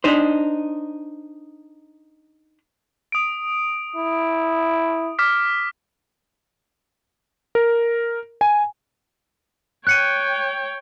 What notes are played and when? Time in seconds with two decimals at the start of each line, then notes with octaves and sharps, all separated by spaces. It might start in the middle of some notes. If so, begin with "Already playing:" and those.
0.04 D4 D#4 C5
3.12 D#6 D7
3.96 E4
5.19 D6 F6 B6
7.55 A#4
8.41 G#5
9.87 C#5 G5 F#6 C#7 D#7